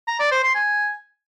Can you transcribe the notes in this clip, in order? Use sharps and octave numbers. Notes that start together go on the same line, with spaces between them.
A#5
D5
C5
C6
G#5